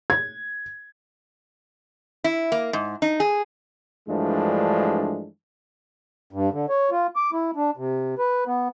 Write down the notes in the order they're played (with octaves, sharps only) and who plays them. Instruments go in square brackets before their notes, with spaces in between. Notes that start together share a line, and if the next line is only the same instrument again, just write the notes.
[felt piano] G#6
[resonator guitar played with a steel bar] E4
A#3
G#2
D#4
G#4
[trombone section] G2 E3 F3 G#3 A3 D4
[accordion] G2
D3
C#5
F4
D6
E4
D4
C3
B4
B3